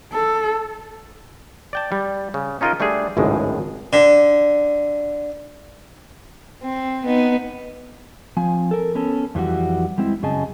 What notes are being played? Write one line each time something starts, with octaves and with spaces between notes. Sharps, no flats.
A4
D5 G5 A5
G3
C#3
C#4 D#4 F4 G#4 A#4 D#5
G3 A3 D4 G#4
G#1 C#2 F#2 A2 G#3
D3
C4
B3 D#4
F3 C4 G#5
A4 A#4
B3 C#4 A4
F2 E3 G3 F#4
G3 G#3 C4 E4
F#2 C#3 G#4 D#5 G#5 A5